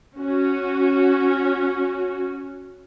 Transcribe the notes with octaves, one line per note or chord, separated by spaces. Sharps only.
C#4 F#4